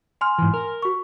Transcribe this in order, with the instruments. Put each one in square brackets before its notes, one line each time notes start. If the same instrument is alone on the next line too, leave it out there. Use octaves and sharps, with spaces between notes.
[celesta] G#5 C6 F6
[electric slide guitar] G#2 E3
A#4
[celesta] F#4 C#6